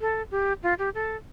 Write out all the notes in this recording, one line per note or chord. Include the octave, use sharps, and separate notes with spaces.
A4
G4
F4
G4
A4